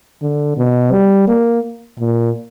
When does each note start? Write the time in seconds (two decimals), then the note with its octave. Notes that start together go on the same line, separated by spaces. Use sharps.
0.22 D3
0.57 B2
0.92 G3
1.28 A#3
1.99 A#2